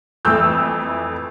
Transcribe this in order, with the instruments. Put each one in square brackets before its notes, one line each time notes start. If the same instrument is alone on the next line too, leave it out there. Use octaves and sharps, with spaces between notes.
[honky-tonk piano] F2 E3 A3 E6 G6